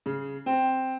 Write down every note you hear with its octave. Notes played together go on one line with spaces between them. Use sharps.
C#3
C4